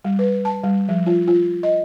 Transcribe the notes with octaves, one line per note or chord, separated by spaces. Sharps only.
G3
B4
A5
G3
F3
F4
F4
D#5